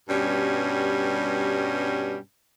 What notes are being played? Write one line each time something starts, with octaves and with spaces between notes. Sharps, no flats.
G2 B2 G3 C#4